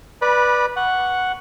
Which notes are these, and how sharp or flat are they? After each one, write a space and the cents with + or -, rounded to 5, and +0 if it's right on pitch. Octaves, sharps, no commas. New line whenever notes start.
B4 -10 D5 +10 B5 -30
F#5 +0 C#6 +0